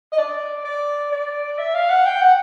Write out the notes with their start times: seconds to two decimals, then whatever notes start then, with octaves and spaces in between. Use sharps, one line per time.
0.12 D#5
0.18 D5
0.65 D5
1.12 D5
1.58 E5
1.75 F5
1.90 F#5
2.06 G5
2.22 F#5